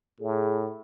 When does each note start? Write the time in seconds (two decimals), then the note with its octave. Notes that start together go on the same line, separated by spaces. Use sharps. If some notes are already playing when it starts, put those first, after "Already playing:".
0.20 A2 G#4